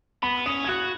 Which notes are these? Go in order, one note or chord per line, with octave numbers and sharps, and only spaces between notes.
B3 B5
C#4 D#6
G#6
F#4 F#6